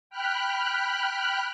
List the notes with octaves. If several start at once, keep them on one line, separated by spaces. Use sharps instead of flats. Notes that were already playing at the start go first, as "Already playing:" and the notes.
G5 B5 F6 F#6